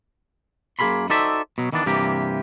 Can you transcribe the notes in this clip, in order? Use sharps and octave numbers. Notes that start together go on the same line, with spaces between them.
F#2 A#3 G#4 A#4 B5 C6
D#4 F#4 A4 C5 D5 E5
B2 F#3
D#3 E3 B3 D4
G2 C3 E3 A#3 G4